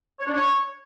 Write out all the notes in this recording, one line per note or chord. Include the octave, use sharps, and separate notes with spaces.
C#5
D4
C#5